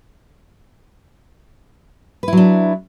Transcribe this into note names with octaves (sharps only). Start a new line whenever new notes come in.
F#3 D4 E4 B4